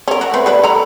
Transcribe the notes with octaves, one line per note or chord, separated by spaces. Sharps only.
C#4 A#4
F#4
A3 C4 B4
G3 D4 B4
A4 A#5 B5